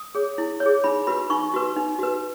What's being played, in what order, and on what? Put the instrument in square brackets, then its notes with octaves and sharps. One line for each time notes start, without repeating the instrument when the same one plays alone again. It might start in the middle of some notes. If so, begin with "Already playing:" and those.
Already playing: [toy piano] D#6
G#4 C#5
E4
C#5
G#4
D#4 B5
F#4 B4 B5
D#4 C#6
F#4 B4
D#4
F#4 B4